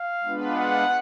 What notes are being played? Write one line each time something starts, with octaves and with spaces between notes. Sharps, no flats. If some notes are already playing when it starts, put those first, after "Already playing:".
Already playing: F5
G#3 B3 D4 F4 B4
F#5